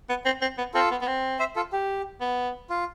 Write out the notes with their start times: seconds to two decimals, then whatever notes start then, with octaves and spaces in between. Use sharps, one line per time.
0.09 B3
0.25 C4
0.41 C4
0.58 B3
0.74 C4 F4 A4
0.91 B3
1.01 B3
1.07 C4
1.39 C5 E5
1.56 F4 A4
1.73 G4
2.21 B3
2.70 F4